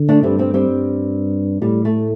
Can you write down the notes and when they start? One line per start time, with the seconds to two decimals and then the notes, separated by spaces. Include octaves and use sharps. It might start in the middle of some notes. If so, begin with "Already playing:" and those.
Already playing: D3
0.08 A3 D4
0.23 G2 G3 C4
0.38 G3 C4
0.54 G3 C4
0.69 G2
1.61 A2 G3
1.85 A3